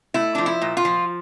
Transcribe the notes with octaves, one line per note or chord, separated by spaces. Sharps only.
A3 E4
F3 D4
E4
A#2
F4
F3